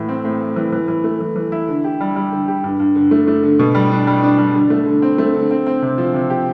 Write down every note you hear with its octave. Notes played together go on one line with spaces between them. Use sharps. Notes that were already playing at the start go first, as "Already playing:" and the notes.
Already playing: A2 E3
C4
A2
A2
E3
E3
E3
A3
E3
E3
E4
D3
G4
G3
G3
D3
G4
G2
G2
D3
A3
A3
D3
B2
G3
D4
G3
D4
G3
D3
A3
D3
C4
A3
D3
C4
C4
C3
F3
C3
G4